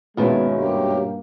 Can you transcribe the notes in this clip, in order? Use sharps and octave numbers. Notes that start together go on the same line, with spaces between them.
G#1 D#2 B2 D#3 G#3 B3 C#4 E4
G2 A#3 G4